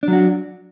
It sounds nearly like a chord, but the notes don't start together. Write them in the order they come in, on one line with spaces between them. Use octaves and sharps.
D4 F#3 F#4